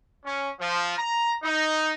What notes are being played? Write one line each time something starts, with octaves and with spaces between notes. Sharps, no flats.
C#4
F3
A#5
D#4